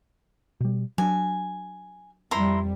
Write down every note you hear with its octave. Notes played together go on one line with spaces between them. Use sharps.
B2 G3
F#3 D4 G#5
F2 G3 E4 A#5 C6